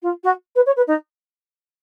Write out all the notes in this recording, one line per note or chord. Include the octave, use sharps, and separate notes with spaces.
F4
F#4
B4
C#5
B4
D#4